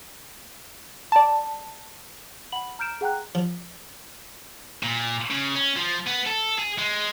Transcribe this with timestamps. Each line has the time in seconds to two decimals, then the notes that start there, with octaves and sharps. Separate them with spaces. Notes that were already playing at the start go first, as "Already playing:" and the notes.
1.12 D5 A5
2.52 F#5 B5 F#7
2.79 A#5 F6 G6 D7 E7
3.01 G#4 F#5 G5 A#5 F#6
3.35 F3
4.83 A#2
5.31 C#3
5.55 C#4
5.76 F3
6.06 B3
6.26 A4
6.58 G#4
6.78 G#3